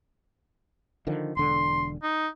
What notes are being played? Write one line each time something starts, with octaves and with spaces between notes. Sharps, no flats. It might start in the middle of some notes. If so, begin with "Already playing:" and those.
D3 D#3 F3
E1 D3 C6
D#4